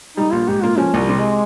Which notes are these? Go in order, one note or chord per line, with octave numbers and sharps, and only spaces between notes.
G3 D#4
A#1 F4
G#2 G4
A#3 F4
F3 C#4
C2 G3
C3
G#3